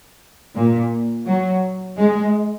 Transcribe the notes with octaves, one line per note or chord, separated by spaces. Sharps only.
A#2
F#3
G#3